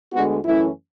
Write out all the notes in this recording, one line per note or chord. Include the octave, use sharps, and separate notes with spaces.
D2 D3 G#3 B3 F#4
F#2 E3 A3 C#4 E4